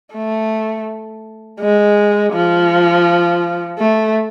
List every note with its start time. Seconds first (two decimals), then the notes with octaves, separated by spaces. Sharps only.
0.14 A3
1.60 G#3
2.33 F3
3.78 A3